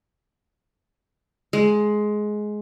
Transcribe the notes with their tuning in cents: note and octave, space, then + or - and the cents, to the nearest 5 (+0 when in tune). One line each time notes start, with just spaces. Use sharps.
G#3 +15